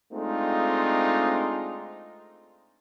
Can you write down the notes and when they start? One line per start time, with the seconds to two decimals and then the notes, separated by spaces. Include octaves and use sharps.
0.12 G#3 A3 C4 D4 D#4 F4